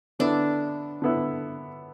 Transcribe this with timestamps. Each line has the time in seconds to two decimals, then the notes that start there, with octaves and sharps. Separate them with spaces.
0.19 D3 B3 D4 E4
1.02 D3 B3 E4